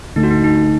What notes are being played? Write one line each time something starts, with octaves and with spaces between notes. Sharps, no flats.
D2 D3 A3 D#4
F#4
D#4
D#4